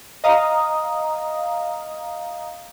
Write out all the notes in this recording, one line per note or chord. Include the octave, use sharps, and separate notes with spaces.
D#5 F5 A#5 D#6